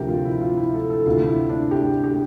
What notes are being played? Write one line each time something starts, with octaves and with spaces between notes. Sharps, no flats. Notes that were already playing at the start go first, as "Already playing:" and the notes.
Already playing: D2 C3 F3 G4 A#4
F4
E4
F4
E4
A4
A4
D2 C3 E3 F4
E4
D4
G4
G4